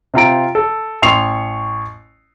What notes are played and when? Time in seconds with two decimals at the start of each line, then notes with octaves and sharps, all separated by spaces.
0.14 C3 F4 A#5 D7
0.55 A4
1.02 A1 C6 C#6 C7 F7